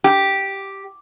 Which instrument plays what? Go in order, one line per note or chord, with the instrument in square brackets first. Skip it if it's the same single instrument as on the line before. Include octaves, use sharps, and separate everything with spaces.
[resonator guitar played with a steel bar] G4